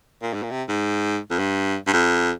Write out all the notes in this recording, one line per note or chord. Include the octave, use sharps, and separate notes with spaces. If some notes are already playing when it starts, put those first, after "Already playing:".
A#2
G#2
A#2
C3
G#2
F2
G2
G2
F2